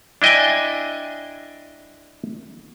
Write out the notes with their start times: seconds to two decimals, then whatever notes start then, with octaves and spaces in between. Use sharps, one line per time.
0.22 D4 E4 D#5 G5 G#5